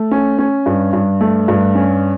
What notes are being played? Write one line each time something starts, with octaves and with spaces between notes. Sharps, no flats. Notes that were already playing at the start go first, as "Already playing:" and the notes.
Already playing: A3
C#4
C#4
G2
G2
A3
G2
C#4